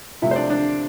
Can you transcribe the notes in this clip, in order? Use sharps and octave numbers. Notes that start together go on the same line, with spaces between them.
C3 F3 A3 E4 E5
C5
D4 D5
D4 D5